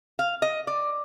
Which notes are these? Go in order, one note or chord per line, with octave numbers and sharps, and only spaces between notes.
F5
D#5
D5